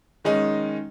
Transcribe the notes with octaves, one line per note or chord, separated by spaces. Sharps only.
D#3 G#3 C#4 D#4